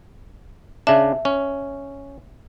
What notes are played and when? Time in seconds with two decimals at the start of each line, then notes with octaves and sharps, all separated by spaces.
0.87 C#3 D4 E5
1.25 C#4